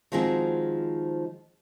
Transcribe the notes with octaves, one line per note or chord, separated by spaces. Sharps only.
D#3 F3 G#3 C4 F#4 G#4